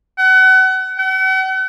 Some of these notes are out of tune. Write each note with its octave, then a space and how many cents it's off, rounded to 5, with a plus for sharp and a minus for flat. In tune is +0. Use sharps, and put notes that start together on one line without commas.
F#5 +30
F#5 +40